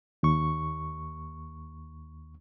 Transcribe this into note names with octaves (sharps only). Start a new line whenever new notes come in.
D#2 C#6